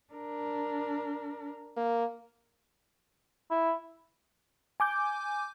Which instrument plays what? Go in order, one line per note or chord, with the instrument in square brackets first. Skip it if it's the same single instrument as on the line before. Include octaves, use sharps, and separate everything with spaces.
[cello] D4 A#4
[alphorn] A#3
[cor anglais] E4
[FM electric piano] G#5 D6 G6